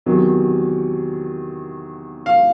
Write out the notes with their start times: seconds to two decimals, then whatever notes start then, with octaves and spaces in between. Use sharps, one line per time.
0.06 E2 C3 D#3 F#3
2.26 F5